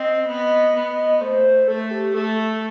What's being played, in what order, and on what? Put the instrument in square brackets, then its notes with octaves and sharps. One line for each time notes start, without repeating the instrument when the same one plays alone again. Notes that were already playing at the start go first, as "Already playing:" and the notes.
Already playing: [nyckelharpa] C4 [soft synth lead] D#5
[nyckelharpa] B3
B3
[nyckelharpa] A3 [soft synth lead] C5
[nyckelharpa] A3 [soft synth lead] A4
[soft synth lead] G4
[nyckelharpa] A3 [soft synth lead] A4